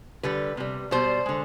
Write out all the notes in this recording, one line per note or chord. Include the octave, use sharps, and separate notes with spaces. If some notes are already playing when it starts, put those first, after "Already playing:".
D3 G3 B4
C3 G3
B2 G3 C5
D3 G#3